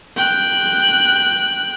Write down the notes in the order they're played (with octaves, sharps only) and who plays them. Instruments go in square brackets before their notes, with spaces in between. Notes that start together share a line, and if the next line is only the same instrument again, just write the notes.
[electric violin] G5 F#6